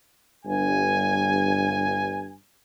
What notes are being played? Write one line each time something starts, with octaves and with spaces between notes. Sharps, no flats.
G1 G2 G#5